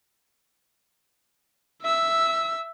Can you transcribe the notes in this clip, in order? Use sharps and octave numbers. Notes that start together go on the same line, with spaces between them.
E5 E6